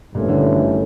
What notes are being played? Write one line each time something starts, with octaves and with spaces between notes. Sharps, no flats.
G#1 G2 A#2 E3 A3 C#4
D3
D3
D#3